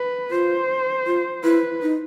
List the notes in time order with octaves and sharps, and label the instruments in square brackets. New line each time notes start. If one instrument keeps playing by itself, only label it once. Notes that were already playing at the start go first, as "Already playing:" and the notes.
Already playing: [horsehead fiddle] B4
[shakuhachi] F4 [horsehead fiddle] C5
[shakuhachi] F4
[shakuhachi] E4 [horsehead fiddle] B4
[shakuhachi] D#4